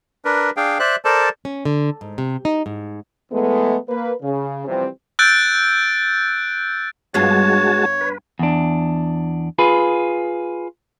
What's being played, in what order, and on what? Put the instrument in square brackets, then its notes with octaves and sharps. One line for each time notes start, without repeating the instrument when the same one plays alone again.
[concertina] D4 A#4 B4
D4 G#4 F5 G5
C5 D5 E5 F#6
A4 A#4 C5 D5 A5
[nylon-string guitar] C#4
D3
G#2
C3
D#4
G#2
[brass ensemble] E2 G#3 A3 B3
A#3 B4
C#3
C3 E3 F3 G3 C4
[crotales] E6 F#6 G6 A6 D7
[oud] G2 B3 F4 [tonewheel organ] G#3 F#4 A5 [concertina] C#5
[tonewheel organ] B4
[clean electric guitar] E2 D4
F4 G#4 B4